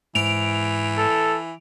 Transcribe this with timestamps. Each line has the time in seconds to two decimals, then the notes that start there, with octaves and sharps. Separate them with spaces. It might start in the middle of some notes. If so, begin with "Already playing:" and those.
0.15 G#2 E3 D7 F7
0.98 A4